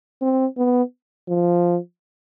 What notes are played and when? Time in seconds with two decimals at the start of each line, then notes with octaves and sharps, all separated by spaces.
0.21 C4
0.57 B3
1.28 F3